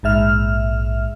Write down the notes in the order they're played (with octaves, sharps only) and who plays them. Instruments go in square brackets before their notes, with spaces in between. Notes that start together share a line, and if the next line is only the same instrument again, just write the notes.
[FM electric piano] A#1 G#2 E5 F6